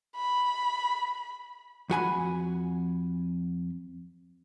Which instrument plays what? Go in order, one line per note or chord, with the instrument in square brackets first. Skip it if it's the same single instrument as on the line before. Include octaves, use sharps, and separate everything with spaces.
[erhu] B5
[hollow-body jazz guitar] F2 F#4 G#5 B5